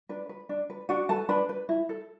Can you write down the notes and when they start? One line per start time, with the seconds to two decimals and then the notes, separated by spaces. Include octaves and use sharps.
0.09 D4 B4
0.29 B4
0.49 D4
0.70 B4
0.89 D4 F#4 F#5
1.09 A4 B4 A5
1.29 D4 B4 B5
1.49 B4
1.69 E4
1.89 A4